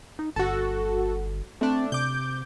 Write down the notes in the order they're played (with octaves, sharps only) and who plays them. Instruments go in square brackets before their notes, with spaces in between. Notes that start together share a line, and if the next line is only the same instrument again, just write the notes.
[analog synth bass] D#4
[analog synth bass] G1 [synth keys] F#4 A4
[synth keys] A3 D4 [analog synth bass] C4
[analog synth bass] C3 [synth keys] D6 G6